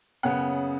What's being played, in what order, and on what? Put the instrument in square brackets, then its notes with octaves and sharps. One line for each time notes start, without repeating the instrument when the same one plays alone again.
[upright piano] F#2 C#3 B3 F#5